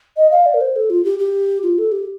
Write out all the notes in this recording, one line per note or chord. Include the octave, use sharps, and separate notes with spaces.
D#5
F5
D5
A#4
C5
A4
F4
G4
G4
F4
A4
G4